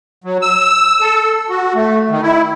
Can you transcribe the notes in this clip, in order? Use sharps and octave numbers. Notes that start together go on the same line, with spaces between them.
F#3
E6
A4
F#4
A3
D#3
E4